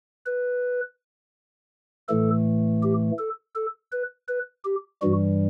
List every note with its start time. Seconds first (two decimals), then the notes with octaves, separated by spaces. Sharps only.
0.26 B4
2.09 A2 E3 A3 A4
2.83 G4
3.19 A4
3.55 A4
3.92 B4
4.28 B4
4.65 G4
5.02 G2 E3 G3 F#4